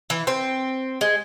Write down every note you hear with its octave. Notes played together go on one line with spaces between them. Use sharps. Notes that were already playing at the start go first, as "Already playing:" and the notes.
E3
C4
G#3